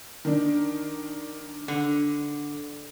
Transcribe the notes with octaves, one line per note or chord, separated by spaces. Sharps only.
D#3 D4
D3